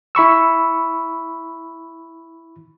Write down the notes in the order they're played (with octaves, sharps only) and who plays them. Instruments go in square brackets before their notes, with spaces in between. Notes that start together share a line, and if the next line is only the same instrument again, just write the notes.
[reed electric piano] E4 B5 C#6 E6